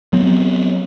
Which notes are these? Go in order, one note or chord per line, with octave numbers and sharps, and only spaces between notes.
F#3 B3 C4